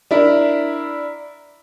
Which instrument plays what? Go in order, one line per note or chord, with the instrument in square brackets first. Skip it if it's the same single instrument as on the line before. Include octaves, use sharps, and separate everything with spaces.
[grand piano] D4 E4 A#4